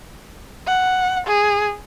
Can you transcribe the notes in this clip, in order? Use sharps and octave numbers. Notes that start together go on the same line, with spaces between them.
F#5
G#4